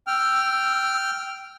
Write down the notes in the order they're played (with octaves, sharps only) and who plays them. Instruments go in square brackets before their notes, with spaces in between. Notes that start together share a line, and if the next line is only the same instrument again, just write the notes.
[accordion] G5 F6 [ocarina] E6